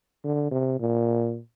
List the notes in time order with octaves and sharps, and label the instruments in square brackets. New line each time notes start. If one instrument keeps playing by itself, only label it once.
[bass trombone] D3
C3
A#2